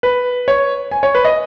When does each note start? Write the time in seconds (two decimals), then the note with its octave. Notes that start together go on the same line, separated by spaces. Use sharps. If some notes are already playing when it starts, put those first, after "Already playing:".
0.03 B4
0.48 C#5
0.91 G#5
1.03 C#5
1.15 B4
1.25 D#5